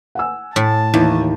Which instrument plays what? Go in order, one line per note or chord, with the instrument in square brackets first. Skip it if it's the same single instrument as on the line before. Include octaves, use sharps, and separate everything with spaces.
[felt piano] F#5 G#5 E6
[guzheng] A2 [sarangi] A5
[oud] D#2 [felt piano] E3 D#4